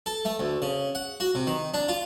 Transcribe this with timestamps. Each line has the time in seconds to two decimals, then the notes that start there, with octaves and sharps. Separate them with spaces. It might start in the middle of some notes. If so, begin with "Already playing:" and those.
0.06 A4
0.25 A3
0.39 D2
0.62 C#3
0.95 F#5
1.20 F#4
1.35 C3
1.47 D#3
1.74 D4
1.88 F4